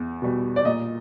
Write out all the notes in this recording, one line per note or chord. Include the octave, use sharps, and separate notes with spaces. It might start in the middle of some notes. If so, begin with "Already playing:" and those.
Already playing: E2
B2 G3
D5
A#2 D#5